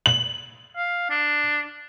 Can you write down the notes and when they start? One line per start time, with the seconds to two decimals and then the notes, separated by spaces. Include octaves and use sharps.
0.06 F#7
0.77 F5
1.10 D4